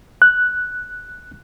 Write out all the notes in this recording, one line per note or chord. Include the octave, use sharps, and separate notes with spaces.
F#6